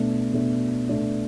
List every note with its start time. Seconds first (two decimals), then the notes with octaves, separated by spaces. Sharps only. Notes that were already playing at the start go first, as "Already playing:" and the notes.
Already playing: B2 A3 D4
0.33 B2 A3 D4
0.89 B2 A3 D4